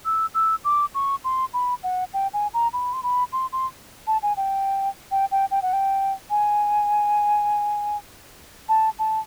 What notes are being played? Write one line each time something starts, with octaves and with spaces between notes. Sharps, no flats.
E6
E6
D6
C#6
C6
B5
F#5
G5
G#5
A#5
B5
C6
B5
C6
C6
A5
G#5
G5
G5
G5
G5
F#5
G5
G#5
A5
A5